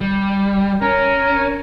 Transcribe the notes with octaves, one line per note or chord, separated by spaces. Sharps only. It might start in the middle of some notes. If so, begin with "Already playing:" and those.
G3
C#4 A#4